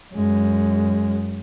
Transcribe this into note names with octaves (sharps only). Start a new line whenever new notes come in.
F#2 G#3